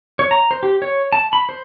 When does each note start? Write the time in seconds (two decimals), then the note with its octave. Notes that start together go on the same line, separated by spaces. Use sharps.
0.19 C#5
0.31 A#5
0.51 C5
0.63 G4
0.82 C#5
1.13 A5
1.33 B5
1.49 C5